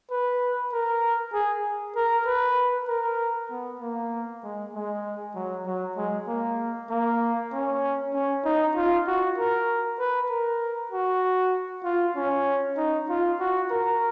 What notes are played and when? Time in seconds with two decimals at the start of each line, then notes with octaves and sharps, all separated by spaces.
0.11 B4
0.72 A#4
1.33 G#4
1.96 A#4
2.26 B4
2.88 A#4
3.50 B3
3.81 A#3
4.43 G#3
4.74 G#3
5.35 F#3
5.66 F#3
5.97 G#3
6.28 A#3
6.90 A#3
7.53 C#4
8.14 C#4
8.45 D#4
8.76 F4
9.07 F#4
9.38 A#4
9.99 B4
10.30 A#4
10.91 F#4
11.84 F4
12.16 C#4
12.77 D#4
13.09 F4
13.40 F#4
13.71 A#4